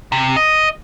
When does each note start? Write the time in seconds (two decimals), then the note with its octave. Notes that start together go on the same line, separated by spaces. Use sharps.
0.12 C3
0.37 D#5